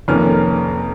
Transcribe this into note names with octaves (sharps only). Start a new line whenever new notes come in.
F1 F2 D#3 A#3 C#4 F6